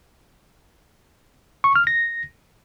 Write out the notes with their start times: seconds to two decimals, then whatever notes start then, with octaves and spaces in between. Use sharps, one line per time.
1.64 C#6
1.76 F6
1.87 A#6